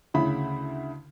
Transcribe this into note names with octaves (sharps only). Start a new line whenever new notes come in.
D2 C#3 E4 B5